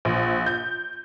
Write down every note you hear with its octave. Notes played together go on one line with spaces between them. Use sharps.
A#1
G6